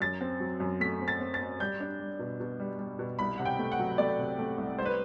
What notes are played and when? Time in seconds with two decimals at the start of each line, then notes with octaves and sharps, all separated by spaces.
0.01 F#2 A6
0.21 C4
0.40 F#3
0.60 F#2
0.80 A3 B6
1.01 C4
1.08 A6
1.21 C4
1.34 A6
1.40 C4
1.60 G3 G6
1.80 D4
1.99 G3
2.19 B2
2.40 B2
2.60 G3
2.79 G3
2.99 B2
3.19 C2 B5
3.38 C3 F#5
3.45 G5
3.59 A3
3.72 F#5
3.79 F#3
3.98 A3 D5
4.19 C3
4.39 A3
4.58 C2
4.78 G3 C5
4.85 B4